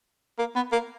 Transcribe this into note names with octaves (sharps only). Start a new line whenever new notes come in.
A#3
B3
A#3